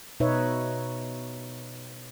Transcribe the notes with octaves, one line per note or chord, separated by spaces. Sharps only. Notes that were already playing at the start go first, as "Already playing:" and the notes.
B2 D#4 B4 C#5 E5